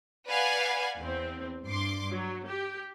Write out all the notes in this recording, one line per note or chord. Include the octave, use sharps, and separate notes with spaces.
B4 D5 F5 F#5 G#5 G#6
E2 C4
G2 C6 D6
F#3
G4